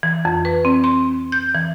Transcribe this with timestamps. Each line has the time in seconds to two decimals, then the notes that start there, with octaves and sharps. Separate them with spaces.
0.03 E3
0.25 F2
0.45 B4
0.65 C4
0.84 C6
1.32 G6
1.55 E3